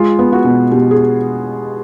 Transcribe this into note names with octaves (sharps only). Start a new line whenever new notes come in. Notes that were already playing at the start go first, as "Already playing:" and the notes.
Already playing: G#3 F4
B3
F#4
B2
B2 G4
G#4